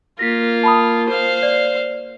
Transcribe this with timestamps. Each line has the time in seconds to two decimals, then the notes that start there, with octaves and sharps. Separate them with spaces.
0.19 A#3 F4 A#6 B6
0.63 A5 B5 D#6
1.09 C5 F5
1.43 D5